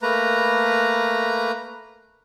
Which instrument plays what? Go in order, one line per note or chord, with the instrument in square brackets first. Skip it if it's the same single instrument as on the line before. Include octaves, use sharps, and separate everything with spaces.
[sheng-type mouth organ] A3 A#3 B4 A#5